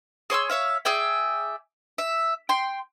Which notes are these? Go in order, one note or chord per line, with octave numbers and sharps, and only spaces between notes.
G#4 C#5 C6 E6
C#5 E5 F5
G#4 D5 E5 G5
E5
G5 C6